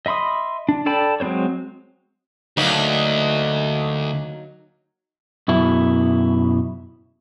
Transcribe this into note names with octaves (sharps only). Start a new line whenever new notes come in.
D#5 E5 B5 C6 D#6
D4
A4 D5 G5 A5 B5
F#3 G#3 C4 C5 C#5
D2 F#3 A#3 D#4
F#2 B2 E4